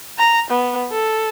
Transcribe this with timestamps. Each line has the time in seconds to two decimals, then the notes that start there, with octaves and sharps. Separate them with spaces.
0.18 A#5
0.51 B3
0.92 A4